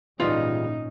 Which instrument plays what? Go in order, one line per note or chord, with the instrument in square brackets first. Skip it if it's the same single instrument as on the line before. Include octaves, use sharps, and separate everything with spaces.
[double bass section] G#1 A#2 C#4 [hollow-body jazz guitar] C#2 E3 G3 [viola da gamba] D#4 [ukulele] F4